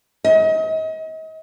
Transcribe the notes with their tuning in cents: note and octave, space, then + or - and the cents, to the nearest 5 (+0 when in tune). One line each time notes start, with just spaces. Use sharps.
D#5 +35